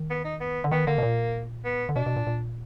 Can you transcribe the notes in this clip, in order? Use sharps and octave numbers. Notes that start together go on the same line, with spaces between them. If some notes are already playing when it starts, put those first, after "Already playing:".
Already playing: D#3
B3
D#4
B3
D3
D#3 B3
D3 A#3
B2
A#2
B3
D3
B2 D4
B2
A#2
A#2